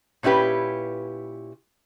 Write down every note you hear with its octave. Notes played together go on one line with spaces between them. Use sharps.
A#2 C#4 E4 G4 B4